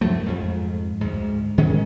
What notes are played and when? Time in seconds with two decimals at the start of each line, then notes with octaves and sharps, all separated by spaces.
0.01 F#2 F3 F#3 A3
0.26 F2 G#2
1.01 D2 G#2
1.58 G#2 D#3 G#3 C#4